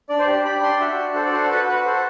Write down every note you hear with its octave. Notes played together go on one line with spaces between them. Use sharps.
D4 D5
C5
G4 D5
G4 B5
D4 C6
F#4 E5
D4
A4 C5
D5
F#4 C5
F#4 B4
F#4 B4
A4 C5